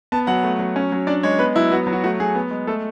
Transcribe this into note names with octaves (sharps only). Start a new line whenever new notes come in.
B3 A5
F#3 F#5
A3
F#3
C#4
F#3
D4 D5
G#3 C#5
B3 B4
F#3 E4
B3 F#4
F#3
F#4
A3 F#4
F#3 G#4
B3
G#3
A3 A4